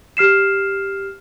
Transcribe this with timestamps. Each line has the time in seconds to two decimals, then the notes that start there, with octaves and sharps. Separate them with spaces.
0.17 G4 F6 C7 E7